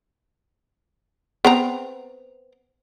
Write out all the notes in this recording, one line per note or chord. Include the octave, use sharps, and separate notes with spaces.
B3 C4 A#5